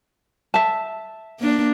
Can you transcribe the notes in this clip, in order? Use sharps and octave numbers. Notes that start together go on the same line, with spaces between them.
E5 A5
A#3 D4